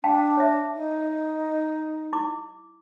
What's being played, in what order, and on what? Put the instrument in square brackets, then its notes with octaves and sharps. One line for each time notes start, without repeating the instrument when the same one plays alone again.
[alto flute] D4 [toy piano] F5 G5 A5
[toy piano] C#5 E5
[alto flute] D#4
[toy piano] E4 D6